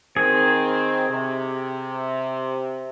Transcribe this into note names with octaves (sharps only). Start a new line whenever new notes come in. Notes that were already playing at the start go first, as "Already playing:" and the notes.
D#3 C4 G#4
C3